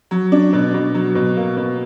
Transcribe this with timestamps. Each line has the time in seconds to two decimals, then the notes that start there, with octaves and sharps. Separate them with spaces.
0.11 F#3
0.32 D4
0.53 B2
0.74 B2
0.95 F#3
1.15 B2
1.37 A#3
1.57 B2